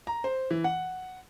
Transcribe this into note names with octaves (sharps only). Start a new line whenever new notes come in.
A#5
C5
E3
F#5